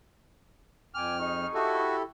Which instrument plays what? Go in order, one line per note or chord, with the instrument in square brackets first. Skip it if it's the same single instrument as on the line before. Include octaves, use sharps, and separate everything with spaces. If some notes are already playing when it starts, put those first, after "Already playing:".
[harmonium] F2 [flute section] G5 G#5 D6 [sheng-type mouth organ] F6
[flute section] D#4 G#4 C#6
[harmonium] E4 G4 A4 [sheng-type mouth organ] F#4